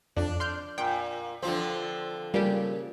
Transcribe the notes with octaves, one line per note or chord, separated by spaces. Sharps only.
F2 D4
C6 F6 G6
A#2 G5
D3 F3 C4 F4 A#5 B5
A#2 C#3 G3 A#3 G4